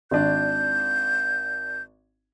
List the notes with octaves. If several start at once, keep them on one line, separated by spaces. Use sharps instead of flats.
G#1 D4 G6